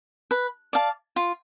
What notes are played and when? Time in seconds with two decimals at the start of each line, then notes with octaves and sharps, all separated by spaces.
0.31 B4
0.73 D5 F5 A5
1.16 F4